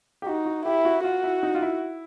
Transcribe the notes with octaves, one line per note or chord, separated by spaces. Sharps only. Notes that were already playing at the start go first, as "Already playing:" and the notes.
G4
D#4 F#4
F#4
E4 G4
F#4
F4 F#4
E4
D#4
F4
E4